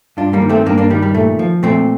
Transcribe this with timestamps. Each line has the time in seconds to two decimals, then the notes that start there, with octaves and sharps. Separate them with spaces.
0.17 G2 D4 F4
0.33 G3 A#3
0.42 D#3
0.49 A3 C4
0.66 G2 A#3 D4
0.78 A#3 D4
0.90 D#3 G3
1.02 G3
1.14 A#2 A3
1.39 F3
1.63 A#2 A3 C4